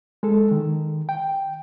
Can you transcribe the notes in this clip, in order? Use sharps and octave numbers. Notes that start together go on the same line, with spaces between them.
G#3 A4
D#3
G5